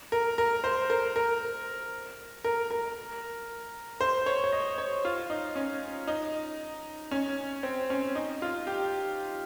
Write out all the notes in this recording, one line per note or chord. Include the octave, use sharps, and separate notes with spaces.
A#4
A#4
C5
A#4
A#4
A#4
A#4
C5
C#5
C#5
D#5
C#5
F4
D#4
C#4
D#4
C#4
C4
C#4
D#4
F4
G4